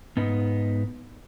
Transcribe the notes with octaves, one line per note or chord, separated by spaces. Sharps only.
G#2 B3 D#4